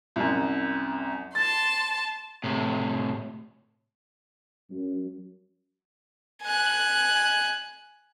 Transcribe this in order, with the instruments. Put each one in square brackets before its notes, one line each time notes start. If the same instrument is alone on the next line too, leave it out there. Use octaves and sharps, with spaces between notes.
[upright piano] C2 F#2
[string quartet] A5 C6 [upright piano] A6
[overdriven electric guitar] A2 C3
[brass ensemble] F#2
[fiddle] G#5 F#6